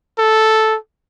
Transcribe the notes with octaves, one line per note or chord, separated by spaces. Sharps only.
A4